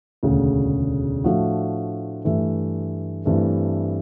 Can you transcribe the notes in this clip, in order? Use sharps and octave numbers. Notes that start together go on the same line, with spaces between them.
E1 D2 C#3
A2 F3 A3 D4 F#4
G2 E3 A3
G2 E3 A3 C4 E4